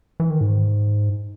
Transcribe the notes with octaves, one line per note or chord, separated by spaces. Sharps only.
E3
D#3
G#2